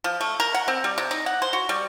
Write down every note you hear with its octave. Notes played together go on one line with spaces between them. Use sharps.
F3
A3
A#4
F#5
C4
G3
C3
D#4
F#5
C5
F#4
G3